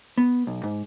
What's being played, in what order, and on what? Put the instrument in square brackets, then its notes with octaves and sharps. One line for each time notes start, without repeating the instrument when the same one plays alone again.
[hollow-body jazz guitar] B3
B1
G#2